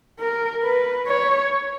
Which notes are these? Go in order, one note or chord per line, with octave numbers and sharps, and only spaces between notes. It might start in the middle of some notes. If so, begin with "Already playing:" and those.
A#4
B4
C#5